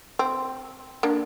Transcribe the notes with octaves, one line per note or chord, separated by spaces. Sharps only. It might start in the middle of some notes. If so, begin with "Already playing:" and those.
C4
A#3 D4